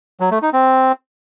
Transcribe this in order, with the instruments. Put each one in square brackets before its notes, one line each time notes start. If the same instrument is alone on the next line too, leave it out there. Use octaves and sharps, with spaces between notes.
[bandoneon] F#3
A3
D#4
C4